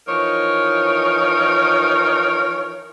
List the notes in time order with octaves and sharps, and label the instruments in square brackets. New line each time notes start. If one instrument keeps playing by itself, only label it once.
[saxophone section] E3 F3 D#4 A#4 C#5